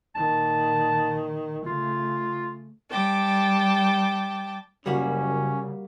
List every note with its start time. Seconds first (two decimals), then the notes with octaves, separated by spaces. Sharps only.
0.16 A#2 D#3 A5
1.66 C#3 A3 F4
2.90 G3 G5 A5 D6
4.86 F#1 C#3 G3 A#3 C#4 F#4